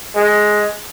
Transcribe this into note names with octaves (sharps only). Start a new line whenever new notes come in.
G#3